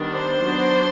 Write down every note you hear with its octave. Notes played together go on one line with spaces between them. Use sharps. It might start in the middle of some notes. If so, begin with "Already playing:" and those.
Already playing: D#3 G3 B3 D4
C5
F#3 B3 D4